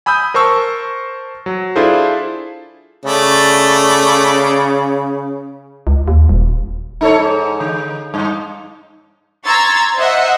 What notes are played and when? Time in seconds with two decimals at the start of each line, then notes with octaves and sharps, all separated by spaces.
0.06 G#5 B5 D#6 E6 G6
0.34 A#4 C5 A5 C#6 E6
1.46 F#3
1.76 D4 E4 F4 G#4 A4 C5
3.05 C#3 A3 D5
5.87 C#2
6.08 D#2
6.29 D#1
7.01 D#4 A4 C#5
7.18 G#2
7.60 D3
8.14 G2
9.46 A#5 C6 C#6 E6 G#6 A6
9.97 C5 D#5 E5 F#5